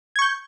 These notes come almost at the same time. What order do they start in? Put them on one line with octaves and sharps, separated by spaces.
G#6 C#6 G6